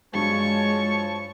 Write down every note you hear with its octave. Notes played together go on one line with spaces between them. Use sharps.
G2 F3 F#3 G#3 C#5 A5 C#6